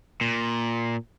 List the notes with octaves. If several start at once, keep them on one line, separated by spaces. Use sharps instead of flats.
A#2